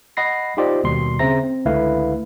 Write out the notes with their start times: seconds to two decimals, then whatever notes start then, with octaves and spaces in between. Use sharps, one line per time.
0.17 D#5 F#5 B5 A#6 C7
0.57 D#4 F4 G4 C5 D5 D#5
0.84 D#2 B2 G3 C6
1.19 C#3 C4 C5 E5 A#5 A#6
1.43 C4
1.65 C#2 D3 A3 E4 B4 F5